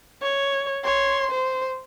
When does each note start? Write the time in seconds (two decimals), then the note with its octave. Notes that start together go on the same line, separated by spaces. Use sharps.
0.22 C#5
0.84 C#5 C6
1.31 C5